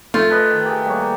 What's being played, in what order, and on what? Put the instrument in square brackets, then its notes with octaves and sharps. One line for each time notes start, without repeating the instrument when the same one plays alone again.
[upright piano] A3 [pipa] F4
[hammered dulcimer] A4 B4 D#5
D#3
G4 G#4
G3 A#3 C#5